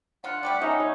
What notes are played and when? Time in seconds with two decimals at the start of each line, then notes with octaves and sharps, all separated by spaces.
0.24 D3 F4 F#5
0.43 G3 A3 G4 D5
0.61 C#4 D#4 E5 A#5
0.80 C#5